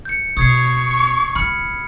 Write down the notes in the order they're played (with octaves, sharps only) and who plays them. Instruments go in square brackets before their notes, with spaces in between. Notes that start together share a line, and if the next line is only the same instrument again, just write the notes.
[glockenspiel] G6 C#7
[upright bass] B2 [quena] C#6 [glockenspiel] D#6 G#6 C7
[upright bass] C#2 [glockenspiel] B5 F6 C#7